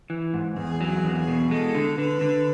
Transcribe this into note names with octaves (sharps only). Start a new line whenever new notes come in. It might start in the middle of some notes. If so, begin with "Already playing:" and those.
E3
G#2
E2 G#4
F#3
G#4
E2
G#4
B2
G#3 A4
D3
D3 B4
D3